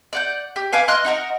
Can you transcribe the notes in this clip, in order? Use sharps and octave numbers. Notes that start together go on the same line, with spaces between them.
D5 F#5 G6
G4
B4 F5 G#5 D6
D#5 C6 F6 F#6
D#4 F#4 A#4